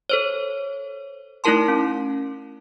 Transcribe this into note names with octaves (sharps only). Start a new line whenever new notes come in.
A4 C5 C#5
A3 D#4 E4 A#4 A5 C6
C#4